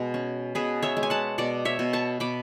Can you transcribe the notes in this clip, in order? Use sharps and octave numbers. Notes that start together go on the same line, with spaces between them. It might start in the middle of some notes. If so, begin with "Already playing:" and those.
Already playing: B2 G#3
C#4
B2 G#4 B4
C#5 E5
G#3
G#5
F#5 A5
B2 D5 F#5
C#5 E5
B2
A5 C#6
B2 B5 D6